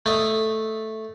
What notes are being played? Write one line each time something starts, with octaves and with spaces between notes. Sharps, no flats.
A3 D#5